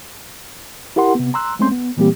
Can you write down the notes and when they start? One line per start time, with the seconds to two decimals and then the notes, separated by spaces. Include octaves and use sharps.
0.96 E4 G4 A#4 F#5 C6
1.15 C3 B3
1.34 A#5 C6 E6 F#6
1.59 G#3 A3 C4 C#4 C6 G6
1.71 B3
1.97 A#2 E3 G3 A#3 C4 G4